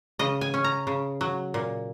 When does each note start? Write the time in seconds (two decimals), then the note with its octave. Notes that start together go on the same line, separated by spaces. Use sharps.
0.19 C#3 D#5
0.41 G#5
0.54 C#4
0.64 A#5
0.87 C#3
1.21 F#3
1.54 A#2